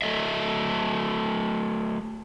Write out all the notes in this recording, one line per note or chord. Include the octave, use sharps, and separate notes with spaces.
F#3 A3 D#5 E5